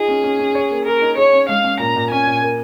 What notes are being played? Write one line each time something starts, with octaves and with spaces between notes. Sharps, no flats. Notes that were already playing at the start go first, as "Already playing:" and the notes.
Already playing: D#4 F4 G#4
C#4
C#4
C#4
C#5
A#3
G#4 A#4
D#4
G#4 C#5
C#4
G#3 F5
C#4
A#2 A#5
A#2
C#4 G#5
A#2
A#3